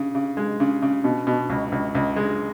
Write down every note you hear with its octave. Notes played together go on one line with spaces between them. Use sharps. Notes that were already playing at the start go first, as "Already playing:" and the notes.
Already playing: C#3
C#3
G#3
C#3
C#3
B2
B2
C#2
C#2
C#2
G#3